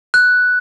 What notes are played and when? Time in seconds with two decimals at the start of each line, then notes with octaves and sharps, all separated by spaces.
0.14 F#6